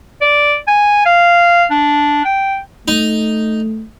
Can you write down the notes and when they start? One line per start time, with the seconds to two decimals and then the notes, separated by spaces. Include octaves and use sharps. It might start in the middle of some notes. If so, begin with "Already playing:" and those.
0.21 D5
0.68 G#5
1.06 F5
1.71 D4
2.25 G5
2.88 A3 D#4